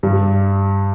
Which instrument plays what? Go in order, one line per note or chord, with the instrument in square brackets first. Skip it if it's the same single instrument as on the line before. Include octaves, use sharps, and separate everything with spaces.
[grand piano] G2 G3